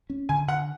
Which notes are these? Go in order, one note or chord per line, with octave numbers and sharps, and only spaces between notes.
C#4
D3 G#5
D3 F#5